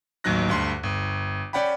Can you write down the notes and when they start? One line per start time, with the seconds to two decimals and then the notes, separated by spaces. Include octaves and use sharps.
0.24 A1 D#2 F#3 D#4 F#6 A#6
0.49 D2 G2 C6
0.83 G1
1.53 C#4 D5 F#5 G5 B5